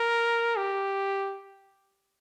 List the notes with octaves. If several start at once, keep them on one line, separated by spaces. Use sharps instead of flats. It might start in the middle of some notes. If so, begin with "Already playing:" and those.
Already playing: A#4
G4